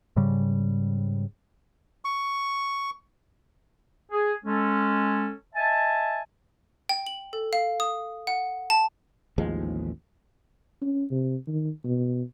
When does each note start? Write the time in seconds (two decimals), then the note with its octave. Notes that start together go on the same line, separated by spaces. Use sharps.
0.16 G#2 C#3 G3
2.05 C#6
4.11 G#4
4.45 G#3 C#4 A4
5.55 D#5 E5 G#5 A5
6.89 G5
7.07 F#7
7.33 A4
7.53 F5
7.80 D#6
8.27 F#5
8.70 A5
9.38 A1 D#2 F3 G#3
10.82 C#4
11.11 C3
11.48 D#3
11.85 B2